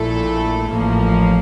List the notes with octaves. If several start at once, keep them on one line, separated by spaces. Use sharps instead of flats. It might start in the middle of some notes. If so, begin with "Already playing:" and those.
Already playing: A#1 A#2 A3 E4 A4
A1 A2 F3 A#3